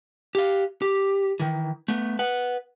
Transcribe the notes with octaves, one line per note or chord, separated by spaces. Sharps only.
G4 F5
G4
D#3 E3
A3 B3
B4 F#5